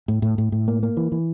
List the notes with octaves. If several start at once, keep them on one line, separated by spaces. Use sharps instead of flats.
A2
A2
A2
A2
A#3
A#3
E3
E3